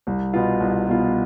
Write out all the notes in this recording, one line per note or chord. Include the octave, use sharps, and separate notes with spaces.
C2
B2 B3 F4
C2
B2 B3 F4